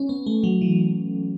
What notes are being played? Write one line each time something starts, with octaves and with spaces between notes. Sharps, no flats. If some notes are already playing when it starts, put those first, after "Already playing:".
Already playing: C#4
B3
A3
F#3
E3